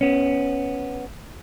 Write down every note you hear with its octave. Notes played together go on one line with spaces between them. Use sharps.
B3 C#4